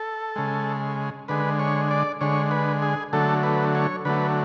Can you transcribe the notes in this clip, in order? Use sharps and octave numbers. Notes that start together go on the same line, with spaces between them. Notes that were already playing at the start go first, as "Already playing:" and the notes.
Already playing: A4
C#3 G#3
D3 G#3 B4
C#5
D5
D3 G#3 C#5
B4
G#4
D3 F#3 A3 A4
B4
C#5
D3 F#3 A3 B4